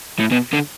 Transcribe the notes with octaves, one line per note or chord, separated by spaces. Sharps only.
A2
B2
D3